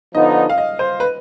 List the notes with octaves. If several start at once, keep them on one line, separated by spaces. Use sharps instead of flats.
D3 F3 B3 D#4 D#5
F5
D#5
C5
B4